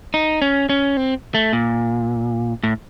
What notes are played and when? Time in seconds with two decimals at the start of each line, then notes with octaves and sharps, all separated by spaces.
0.14 D#4
0.42 C#4
0.69 C#4
0.97 C4
1.35 A3
1.53 A#2
2.63 A2